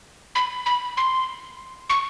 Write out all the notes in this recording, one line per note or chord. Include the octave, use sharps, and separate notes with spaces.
B5
B5
C6
C#6